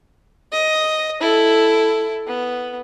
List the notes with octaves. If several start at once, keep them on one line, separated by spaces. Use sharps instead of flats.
D#5
E4 A4
B3